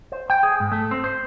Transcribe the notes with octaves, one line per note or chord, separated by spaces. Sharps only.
C5
G5
G#4
G#2
A3
C4
C5